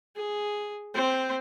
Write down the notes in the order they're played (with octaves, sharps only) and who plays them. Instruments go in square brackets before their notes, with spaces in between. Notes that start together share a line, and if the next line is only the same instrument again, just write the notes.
[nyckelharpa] G#4
C4 C5